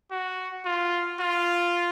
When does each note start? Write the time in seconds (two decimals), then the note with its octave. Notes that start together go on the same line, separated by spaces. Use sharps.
0.11 F#4
0.65 F4
1.20 F4